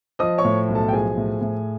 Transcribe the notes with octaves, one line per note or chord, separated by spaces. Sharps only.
F3 D#5 D#6
C#5 C#6
A2
B1
A4 A5
G5
F3 G#4 G#5
A2
A2